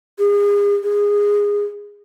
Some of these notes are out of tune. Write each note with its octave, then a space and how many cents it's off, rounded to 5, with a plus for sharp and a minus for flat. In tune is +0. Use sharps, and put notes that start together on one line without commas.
G#4 -35
G#4 -20